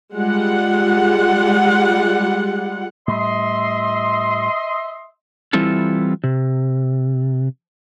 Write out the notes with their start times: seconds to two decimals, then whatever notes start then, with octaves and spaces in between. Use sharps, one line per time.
0.15 G3 G#3 F4 F#5
3.08 A2 G3 D#5 E5 C6
5.53 E3 G3 C4 E4 F4 A4
6.24 C3